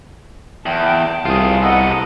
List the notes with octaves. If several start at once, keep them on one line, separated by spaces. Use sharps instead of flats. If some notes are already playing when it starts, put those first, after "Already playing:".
E2 G5 A5
C2 F4 G#4
B3 A4 D#5 F#5 A#5